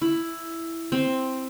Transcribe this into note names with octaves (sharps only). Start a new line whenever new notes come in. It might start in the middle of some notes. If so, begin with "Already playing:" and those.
E4
C4